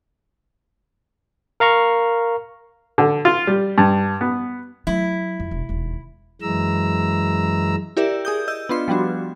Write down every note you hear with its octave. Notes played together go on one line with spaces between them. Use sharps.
A#4 F5 A#5 C#6
D3
F4
G3
G2
B3
F#3 A3 E4
F2
E1
E1 D#2
F#2 E3 G#3 A#5 E6
E4 G4 A#4 D5 E5
G#4 D#6 G6
D#5 E6 G6
B3 D4 F4 C6
F3 G3 B3 D4 F#4